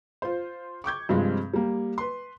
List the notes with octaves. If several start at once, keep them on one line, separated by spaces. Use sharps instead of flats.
F4 C5
C#6 D6 G6 G#6
G2 C3 F3 G#3 C4 F4
G3 A#3
B4 C6